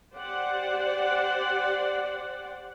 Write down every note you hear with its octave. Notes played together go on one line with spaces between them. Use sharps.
G4 C5 D5 F#5